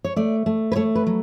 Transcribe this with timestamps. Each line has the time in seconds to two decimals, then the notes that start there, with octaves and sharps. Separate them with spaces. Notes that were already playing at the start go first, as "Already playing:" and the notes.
0.04 C#5
0.16 A3 D5
0.46 A3
0.72 B4
0.76 A3 C#5
0.95 B4
1.07 F#3